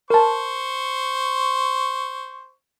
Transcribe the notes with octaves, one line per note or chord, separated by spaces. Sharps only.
A#4 C5 A5 C#6